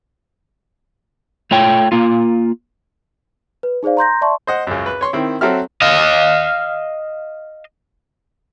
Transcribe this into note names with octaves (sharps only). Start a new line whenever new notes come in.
A3 F4 C#5 G5
A#3 F4
B4
D#4 G#4 C5 D5 F5
A#5 C6 G6 A#6
D5 E5 A5 C6 C#6
C5 D#5 F#5
C#2 F#2
B4
C#5 C6 C#6
D#3 C4 E4
F#3 C4 F#4 A4 E5 F6
D#5 F5